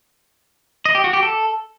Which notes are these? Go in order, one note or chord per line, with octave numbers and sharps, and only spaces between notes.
D#5
G4
F#4
G4
A4